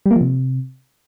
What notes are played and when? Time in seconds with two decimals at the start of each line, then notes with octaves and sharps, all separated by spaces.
0.06 G3
0.11 A#3
0.16 F3
0.21 C3